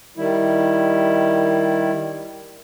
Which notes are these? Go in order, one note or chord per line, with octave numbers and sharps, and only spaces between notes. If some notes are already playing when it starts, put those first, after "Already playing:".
D#3 G3 E4